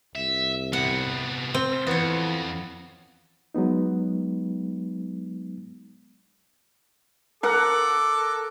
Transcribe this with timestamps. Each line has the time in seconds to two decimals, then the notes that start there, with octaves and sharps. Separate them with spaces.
0.15 C2 E5
0.73 C3 B3 F#5
1.54 C4
1.87 F2 E3 B3 C#5
3.55 F#3 G#3 B3 D#4
7.43 A4 A#4 F#5 D6